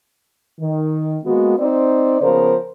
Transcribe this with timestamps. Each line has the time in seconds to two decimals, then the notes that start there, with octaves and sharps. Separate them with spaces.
0.59 D#3
1.24 G#3 A#3 B3 F#4
1.58 C4 D#4 C5 D5
2.22 C#3 F3 B3 A#4 C5